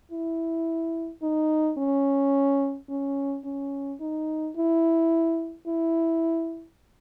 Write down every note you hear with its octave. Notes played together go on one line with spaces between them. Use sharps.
E4
D#4
C#4
C#4
C#4
D#4
E4
E4